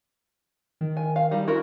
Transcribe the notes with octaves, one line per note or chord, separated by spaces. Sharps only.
D#3
G#5
F5
G3 D#4
E4 F#4 A#4